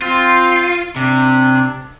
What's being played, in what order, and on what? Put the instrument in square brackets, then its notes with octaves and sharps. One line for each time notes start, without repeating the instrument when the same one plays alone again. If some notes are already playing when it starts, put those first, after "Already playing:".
[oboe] C4 [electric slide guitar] F4
[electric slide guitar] C3 [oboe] D4